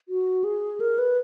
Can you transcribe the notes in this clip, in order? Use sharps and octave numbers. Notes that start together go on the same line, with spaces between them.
F#4
G#4
A#4
B4